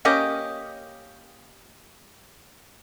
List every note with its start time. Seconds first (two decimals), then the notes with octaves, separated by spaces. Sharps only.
0.05 A#3 C#4 G4 D#5